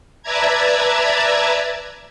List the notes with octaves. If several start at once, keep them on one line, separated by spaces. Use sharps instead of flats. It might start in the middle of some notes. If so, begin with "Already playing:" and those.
B4 D5 E5 A5 A#5 G#6